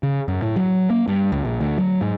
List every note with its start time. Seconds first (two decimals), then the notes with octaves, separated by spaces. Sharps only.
0.03 C#3
0.28 F#2
0.42 A2
0.56 F#3
0.90 A#3
1.08 G2
1.32 C#2
1.45 A#1
1.61 D2
1.78 F#3
2.01 G#2